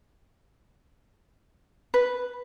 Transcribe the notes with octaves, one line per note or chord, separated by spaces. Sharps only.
B4